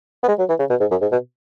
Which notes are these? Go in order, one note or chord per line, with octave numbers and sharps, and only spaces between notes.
B3
G#3
F#3
E3
C#3
B2
G#2
F#2
G#2
B2